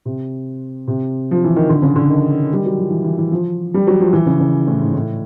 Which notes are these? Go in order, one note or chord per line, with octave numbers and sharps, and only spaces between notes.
C3
C3
F3
E3
D#3
D3
C#3
D3
D#3
G3
F#3
F3
E3
E3
E3
F3
G3
F#3
F3
E3
C#3
C#3
A2
G#2
A2